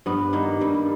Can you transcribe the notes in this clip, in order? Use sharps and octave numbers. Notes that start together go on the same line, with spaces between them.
G2 B3
D#3 A#3
G2 G3